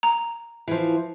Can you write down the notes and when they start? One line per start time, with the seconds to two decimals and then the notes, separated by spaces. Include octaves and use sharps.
0.03 A#5
0.68 E3 F3